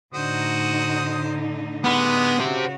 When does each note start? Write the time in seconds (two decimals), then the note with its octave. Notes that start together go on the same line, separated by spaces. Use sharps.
0.14 A2 D3 D#4 F#4 C5 D#6
1.84 G3 G#3 B3 D#6
2.40 C#3 F#4 G4 C5